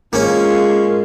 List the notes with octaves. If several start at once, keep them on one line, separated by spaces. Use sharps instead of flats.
G#3 A#3 C#4 F4